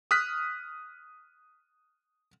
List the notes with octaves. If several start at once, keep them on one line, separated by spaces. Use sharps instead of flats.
D#6 F6 F#6 B6